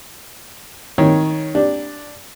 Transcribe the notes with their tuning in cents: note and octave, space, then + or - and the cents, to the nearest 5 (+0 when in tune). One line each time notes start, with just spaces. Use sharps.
D#3 +15 C#5 +0
D4 +0 G4 +0